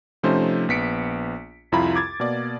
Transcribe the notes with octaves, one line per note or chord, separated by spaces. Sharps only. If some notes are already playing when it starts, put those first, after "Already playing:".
C3 F3 A3 C#4 D#4 C5
A#1 B3 B6 C#7 D7
C2 F2 E4 F4 A#5 B5
D6 G#6 A6
B2 A#3 D5